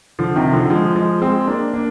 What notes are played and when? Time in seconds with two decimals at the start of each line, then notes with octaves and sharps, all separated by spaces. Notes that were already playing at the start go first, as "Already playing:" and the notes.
0.19 D3 F3
0.36 C3 D#3
0.53 D3 F3
0.70 F3 G#3
0.96 F3 G#3
1.22 G#3 C4
1.47 A#3 D4
1.74 A#3 D4